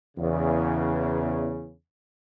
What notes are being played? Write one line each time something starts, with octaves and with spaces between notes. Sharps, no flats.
E2 C#3